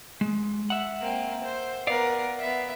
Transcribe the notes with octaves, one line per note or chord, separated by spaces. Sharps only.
G#3
E5 F#5
A#3 C4
C5
B3 A#4 D5 F5
B3 E5